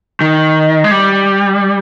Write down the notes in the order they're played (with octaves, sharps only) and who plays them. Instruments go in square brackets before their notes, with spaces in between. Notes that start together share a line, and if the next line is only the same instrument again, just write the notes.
[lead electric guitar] D#3
G#3
G3